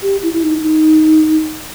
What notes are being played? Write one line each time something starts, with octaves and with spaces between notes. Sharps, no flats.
G4
E4
E4
D#4
D#4